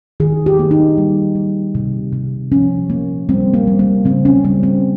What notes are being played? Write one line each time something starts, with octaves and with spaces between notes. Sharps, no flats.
D#3 G#4
G4
A#3
D#4
G3
G3
C3
C3
F3 C#4
A#3
G3 C4
A#3
G3
A#3
C#3 C4
C#4
G3 C#4
C4